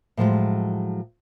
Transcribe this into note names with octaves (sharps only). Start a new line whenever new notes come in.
A2 F3 F#3 G#3